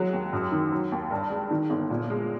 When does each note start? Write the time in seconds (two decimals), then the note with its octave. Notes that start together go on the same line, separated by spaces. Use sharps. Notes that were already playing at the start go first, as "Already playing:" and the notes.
Already playing: F#3 G#3
0.13 D#2
0.33 F#2
0.52 D#3
0.72 F#3
0.92 D#2
1.11 G2
1.30 G#3
1.51 D#3
1.70 G1
1.90 A#2
2.10 G#3